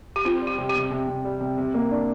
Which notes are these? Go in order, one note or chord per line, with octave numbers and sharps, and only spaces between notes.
G4
C4 F4
G3
G4
C3
G4
C3
C3
C3
G3
C3
C3
A#3
D4